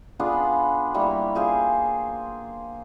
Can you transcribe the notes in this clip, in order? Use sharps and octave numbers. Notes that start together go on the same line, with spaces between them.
B3 D4 F4 G#4
G3 A#3 E4 C#6
F4 G#4 C5 F5